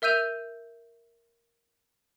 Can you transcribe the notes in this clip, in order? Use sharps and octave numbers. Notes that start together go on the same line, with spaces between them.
A#4 E5 E6 G6 D#7 F7